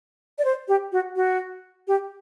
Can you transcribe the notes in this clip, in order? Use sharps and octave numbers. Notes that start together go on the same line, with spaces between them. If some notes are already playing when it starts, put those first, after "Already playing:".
D5
C5
G4
F#4
F#4
G4